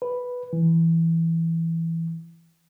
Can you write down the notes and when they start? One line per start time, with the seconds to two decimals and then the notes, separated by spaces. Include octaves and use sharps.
0.02 B4
0.53 E3